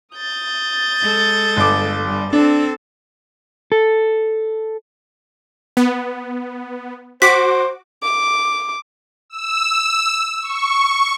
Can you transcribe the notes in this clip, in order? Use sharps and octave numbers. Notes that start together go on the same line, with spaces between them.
D#6 G6 A6
G#3 A4
G1 D6
G2 G3
C4 D4 A4
A4
B3
F#4 C5 D6 B6
D6
E6
C#6